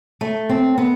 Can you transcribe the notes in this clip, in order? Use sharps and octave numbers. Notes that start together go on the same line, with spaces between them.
A3
C4
B3